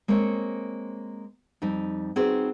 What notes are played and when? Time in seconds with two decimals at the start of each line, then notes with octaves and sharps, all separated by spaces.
0.08 G#3 A#3 C4 C5 C#5
1.62 F2 G3 D#4
2.16 C4 D#4 F#4 G#4 B4 C5